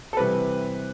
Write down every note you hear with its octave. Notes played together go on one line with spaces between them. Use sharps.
A4
C3 E3 G3 C4 B4